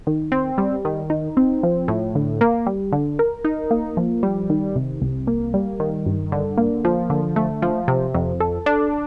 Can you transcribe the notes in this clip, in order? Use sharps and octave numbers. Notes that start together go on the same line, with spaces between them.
D#3
C4
G3
D#3
D#4
C4
F3
A2
D3
A#3
G3
D3
A#4
D#4
A#3
F3
G3
D#3
C3
C2
A#3
G3
D#3
G2
D3
A#3
F3
D3
A3
F3
C3
F2
A4
D4